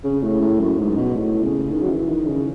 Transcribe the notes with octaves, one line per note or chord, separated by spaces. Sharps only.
C#3
A2
A2
F#2
G#2
B2
A2
C#3
D#3
F#3
E3
D#3
C#3